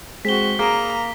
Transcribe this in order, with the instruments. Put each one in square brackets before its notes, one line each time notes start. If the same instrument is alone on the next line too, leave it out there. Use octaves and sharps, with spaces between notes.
[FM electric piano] G#3 G#4 [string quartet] C4 F#4 [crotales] B6 G7
[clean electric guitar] A#3 [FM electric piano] G#4 B5 D#6 [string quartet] A#5